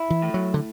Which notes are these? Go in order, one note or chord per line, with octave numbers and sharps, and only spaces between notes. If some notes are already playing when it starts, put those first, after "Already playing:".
Already playing: E4
E3
A2
F#3
D3